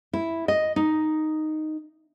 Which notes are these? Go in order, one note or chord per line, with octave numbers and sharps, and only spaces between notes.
E4
D#5
D#4